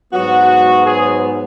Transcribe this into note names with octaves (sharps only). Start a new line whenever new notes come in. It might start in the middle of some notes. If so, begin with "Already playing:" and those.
G#2 F#3 B3 F#4
G#4